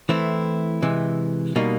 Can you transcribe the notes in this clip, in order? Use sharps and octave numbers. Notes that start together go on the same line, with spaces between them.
E3 A3 C4 E4
C3 E3 G#3
B2 G3 A#3 D#4